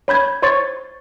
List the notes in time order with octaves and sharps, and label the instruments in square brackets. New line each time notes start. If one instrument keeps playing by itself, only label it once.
[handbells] C#5 B5 G6 G#6
C5 C#5 C6 C#6 G#6 A6